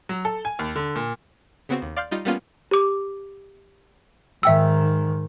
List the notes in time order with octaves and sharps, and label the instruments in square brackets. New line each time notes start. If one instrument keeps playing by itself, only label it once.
[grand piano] F#3
A4
G#5
D#2
D3
A#2
[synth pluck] C#3 B3 C4 F#4
D#2
D5 F5 C6 F6 G6
G3 D#4 F4
G3 A#3 B3 C#4 F4
[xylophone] G4 D6
[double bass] G#2 D#3 [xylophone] E5 G5 E6